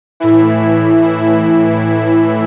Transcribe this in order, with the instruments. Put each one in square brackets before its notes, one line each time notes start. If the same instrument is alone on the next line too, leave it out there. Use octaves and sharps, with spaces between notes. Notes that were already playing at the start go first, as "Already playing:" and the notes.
[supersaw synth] A2 E3 E4
E4